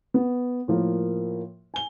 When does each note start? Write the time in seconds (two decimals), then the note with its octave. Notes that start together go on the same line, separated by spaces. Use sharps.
0.14 B3
0.68 A2 F3 A#3 A#4
1.74 G#5 G7